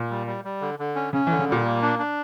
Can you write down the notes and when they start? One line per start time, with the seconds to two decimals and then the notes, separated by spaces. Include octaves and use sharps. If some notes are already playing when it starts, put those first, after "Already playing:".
Already playing: A#2
0.10 G3
0.27 G3
0.45 G3
0.61 D3
0.79 D3
0.96 C#4
1.13 C#3 C#4
1.27 E3
1.31 D3
1.39 C#3
1.48 A#2 G3
1.65 A#3
1.82 D4
1.99 D4